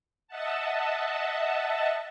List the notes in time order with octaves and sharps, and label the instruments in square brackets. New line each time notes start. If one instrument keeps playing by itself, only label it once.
[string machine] D#5 E5 F#5 A5